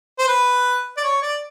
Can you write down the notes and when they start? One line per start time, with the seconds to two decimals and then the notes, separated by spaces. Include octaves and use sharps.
0.18 C5
0.28 B4
0.97 D5
1.04 C#5
1.22 D5